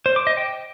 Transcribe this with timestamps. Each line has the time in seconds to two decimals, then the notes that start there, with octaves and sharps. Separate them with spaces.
0.06 C5
0.16 D6
0.27 D#5
0.37 G5